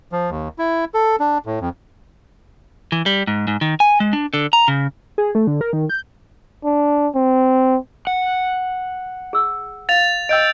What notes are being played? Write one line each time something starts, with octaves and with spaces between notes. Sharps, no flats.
F3
D#2
E4
A4
D4
A2
F2
E3
G3
G#2
G#2
D#3
G#5
G#3
D4
D3
A#5
C#3
G#4
A3
D3
A#4
D#3
G6
D4
C4
F#5
G#4 E6
F5 A6 F7
D#5 G5 E6 G6 D7